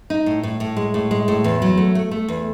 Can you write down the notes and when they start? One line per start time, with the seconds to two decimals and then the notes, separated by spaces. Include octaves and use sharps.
0.10 D#4
0.26 A2
0.43 A2
0.60 A2
0.77 G#3
0.94 A2
1.11 G#3
1.28 A2
1.44 E2
1.62 F#3
1.77 A3
1.95 A3
2.11 A3
2.28 E2